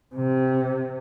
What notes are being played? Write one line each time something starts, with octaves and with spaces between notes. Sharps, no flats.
C3